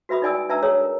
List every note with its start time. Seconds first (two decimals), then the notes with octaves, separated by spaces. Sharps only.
0.09 F#4 B4 E5 B5 D#6
0.22 D#4 E4 D5 G#5 D#6 E6
0.34 G#5
0.49 D4 B4 E5 A5 A#5 E6
0.62 G#4 C#5 A#5 D#6 E6
0.80 A#4